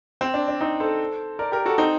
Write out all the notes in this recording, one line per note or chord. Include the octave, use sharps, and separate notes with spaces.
C4
D4
D4
C4 D#4
A4 C5
A#4 D5
G4 A#4
F#4 A4
C4 D#4